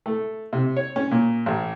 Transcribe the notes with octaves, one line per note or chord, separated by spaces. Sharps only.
A3
C3
C#5
C#4
A#2
A1